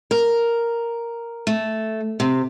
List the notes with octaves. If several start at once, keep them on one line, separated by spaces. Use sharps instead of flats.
A#4
A3
C3